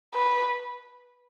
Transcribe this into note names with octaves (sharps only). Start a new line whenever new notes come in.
B4